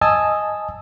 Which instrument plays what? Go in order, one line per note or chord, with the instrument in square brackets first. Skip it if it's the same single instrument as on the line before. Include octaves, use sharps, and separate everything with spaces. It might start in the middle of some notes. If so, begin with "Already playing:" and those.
[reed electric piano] D#5 G#5 A5 D#6 E6